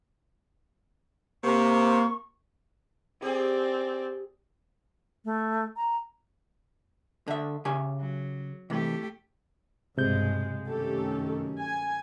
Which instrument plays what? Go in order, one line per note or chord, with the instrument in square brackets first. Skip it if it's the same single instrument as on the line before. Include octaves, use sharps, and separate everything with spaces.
[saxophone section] C3 [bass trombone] A#3 [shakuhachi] C#6
[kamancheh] C4 D5 [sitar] G4 G#4
[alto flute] A3
A#5
[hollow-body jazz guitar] D3 E5
C#3 G4 G#5
[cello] F#3
[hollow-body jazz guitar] C3 E3 [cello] A3 G4
[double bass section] B1 G2 [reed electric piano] C3 G6 [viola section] G#3
[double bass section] F#2 D#3 C#4 [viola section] A3 G4 A4
[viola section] G#5